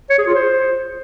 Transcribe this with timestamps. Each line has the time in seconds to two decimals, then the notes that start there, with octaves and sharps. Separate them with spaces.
0.10 C#5
0.18 G#4
0.27 F4
0.35 C5